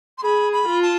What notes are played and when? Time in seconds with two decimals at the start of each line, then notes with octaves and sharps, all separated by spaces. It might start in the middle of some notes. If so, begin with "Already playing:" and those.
0.18 C6
0.23 G#4 B5
0.53 B5
0.68 F4
0.82 A5